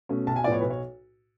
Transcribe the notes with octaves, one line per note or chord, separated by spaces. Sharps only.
B2 A3 C#4
B1 A5
G#5
A2 F3 B3 D5
C#5
B1 B4
C#5